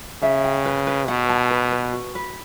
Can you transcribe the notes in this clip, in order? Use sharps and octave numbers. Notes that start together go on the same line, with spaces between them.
C#3 E5
G5
B4
B4
B2 F#5
A5
B4
B4
F#4
B4